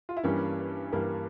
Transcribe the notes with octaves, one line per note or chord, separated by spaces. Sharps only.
F4
E4
G2 E3 G3 A#3 C#4
G2 E3 G3 A#3